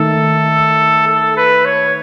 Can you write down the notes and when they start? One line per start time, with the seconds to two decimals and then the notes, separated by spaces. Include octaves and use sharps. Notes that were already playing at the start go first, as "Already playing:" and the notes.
Already playing: D#3 A3 A4
1.08 A4
1.37 B4
1.65 C#5